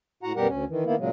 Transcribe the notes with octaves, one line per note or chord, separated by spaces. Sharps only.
A2 F#4 F#5 A#5
F#2 B2 G3 G4 A#4 F#5
D2 C#4
D#3 E3
D#3 A#3 B3 E4
A#2 C#3 F#3 G#3